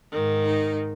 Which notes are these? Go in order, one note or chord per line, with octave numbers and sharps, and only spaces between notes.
G#2 D#3
D#4